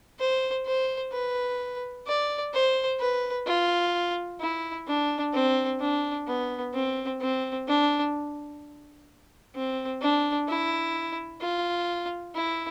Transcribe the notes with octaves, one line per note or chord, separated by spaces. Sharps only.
C5
C5
B4
D5
C5
B4
F4
E4
D4
C4
D4
B3
C4
C4
D4
C4
D4
E4
F4
E4